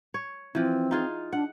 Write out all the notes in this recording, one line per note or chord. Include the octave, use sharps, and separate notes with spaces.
C#5
E3 F3 C4
D#4 F4 G#4
D4 F#5